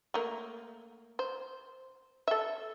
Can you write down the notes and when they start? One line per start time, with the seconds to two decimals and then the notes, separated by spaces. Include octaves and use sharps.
0.14 A3 A#3
1.19 C5
2.28 A4 E5